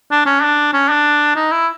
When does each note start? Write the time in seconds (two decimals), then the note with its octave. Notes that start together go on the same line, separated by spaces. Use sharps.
0.11 D4
0.26 C#4
0.42 D4
0.73 C#4
0.89 D4
1.36 D#4
1.51 E4